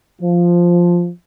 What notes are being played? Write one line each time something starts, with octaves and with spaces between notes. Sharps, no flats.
F3